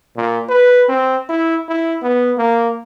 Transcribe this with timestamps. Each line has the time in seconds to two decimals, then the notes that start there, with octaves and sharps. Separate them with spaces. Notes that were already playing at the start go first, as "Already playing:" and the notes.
0.17 A#2
0.49 B4
0.89 C4
1.29 E4
1.69 E4
2.03 B3
2.38 A#3